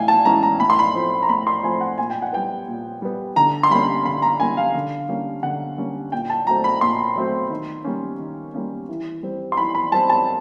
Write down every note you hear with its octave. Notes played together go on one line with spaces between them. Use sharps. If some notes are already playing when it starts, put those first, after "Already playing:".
Already playing: A2 E3 C#4 F5 G5 G#5
A5
E3 G#3 C#4 A#5
A#5
A2 B5
C6
B5
F3 A3 C4
A#5
A2 B5
C6
F3 A3 C4 G#5
F#5
A#2 G#5
G5
F#5
G3 B3 G5
A#2
G3 B3
D3 A#5
C6
G3 A#3 C#4 B5
D3 B5
A#5
G3 A#3 C#4 G#5
F5
D3
G3 A#3 C#4
D3 F#5
G3 A#3 C#4
A#2 G5
A5
F#3 A3 C4 A#5
B5
A#2 C6
F#3 A3 C4
D#3
G3 A#3 C#4
D#3
G3 A#3 C#4
E3
G3 C4
C6
E3 B5
B5
G3 C4 A5
A5